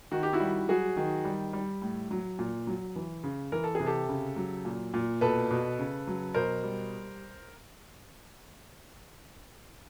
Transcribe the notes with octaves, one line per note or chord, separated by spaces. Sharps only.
D#3 F#4
G4
E4 F#4
G3
F#3 F#4 G#4
D#3
G3
G3
A2
F#3
A#2
F#3
E3
C#3
E3 A#4
A4
C3 G#4
G4 A4
C#3
F#3
A#2
A#2
B2 A4 B4
B2
C#3
F#3
B2 A#4 C5
G3